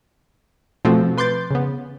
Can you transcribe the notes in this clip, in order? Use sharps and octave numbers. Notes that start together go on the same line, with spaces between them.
B2 F3 A3 C4 F#4 A4
B4 C6 D6 G6 A6
C#3 B3